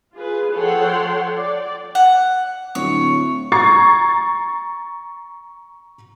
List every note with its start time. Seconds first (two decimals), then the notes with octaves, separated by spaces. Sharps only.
0.15 F4 G#4 B4
0.55 F3 A4 C#5 F#5 G5 C6
1.36 D5
1.95 F#5
2.75 D1 C#5
3.52 A#5 C#6 G#6 A6 C7